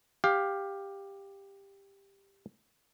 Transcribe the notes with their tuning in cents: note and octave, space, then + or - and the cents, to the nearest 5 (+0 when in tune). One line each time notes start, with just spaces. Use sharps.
G4 +10 F5 +10